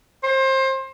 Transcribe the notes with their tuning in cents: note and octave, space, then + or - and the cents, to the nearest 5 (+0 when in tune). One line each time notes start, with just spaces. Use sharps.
C5 +25